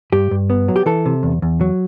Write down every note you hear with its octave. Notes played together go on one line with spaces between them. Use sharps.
G2 G4
G2
B3
F#3
G4
E3 A4
C3
E2
E2
F#3